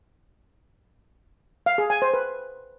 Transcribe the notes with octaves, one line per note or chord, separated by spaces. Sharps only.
F5
G#4
G#5
C5
B4